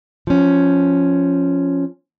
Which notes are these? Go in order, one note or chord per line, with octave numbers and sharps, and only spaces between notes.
F3 C#4